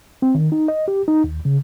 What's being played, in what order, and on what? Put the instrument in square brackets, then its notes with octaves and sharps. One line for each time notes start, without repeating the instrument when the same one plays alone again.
[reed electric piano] C4
D#3
D#4
D#5
G4
D#4
D#2
C#3